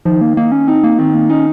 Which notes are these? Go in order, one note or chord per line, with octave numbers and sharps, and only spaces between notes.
D#3 F3
A#3
A#3 D#4
C#4
C4 D#4
A#3
D#3 C4
A#3
C#4 D#4